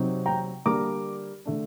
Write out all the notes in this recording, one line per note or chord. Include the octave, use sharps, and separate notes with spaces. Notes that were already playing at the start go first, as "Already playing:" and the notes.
Already playing: C3 F#3 C4 D#4
G5 A#5
D3 G3 A#3 D4 A#5 D6
D3 A3 D4